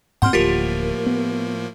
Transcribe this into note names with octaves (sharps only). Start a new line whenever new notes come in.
G#2 B2 C4 F#5 C6 F6 G6
D1 A2 F3 A#3 F4 G4 A#4
B3